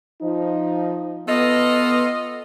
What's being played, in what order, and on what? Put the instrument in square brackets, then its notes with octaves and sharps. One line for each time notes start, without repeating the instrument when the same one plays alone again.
[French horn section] F3 D#4
[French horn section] B3 [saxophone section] F4 A4 D#5